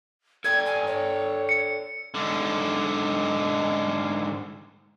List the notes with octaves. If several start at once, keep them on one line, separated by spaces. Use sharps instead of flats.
A4 D5 G5 G#6
G#5
C#5
C#7
G#2 D3